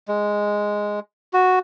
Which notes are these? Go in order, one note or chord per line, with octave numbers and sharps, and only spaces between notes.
G#3
F#4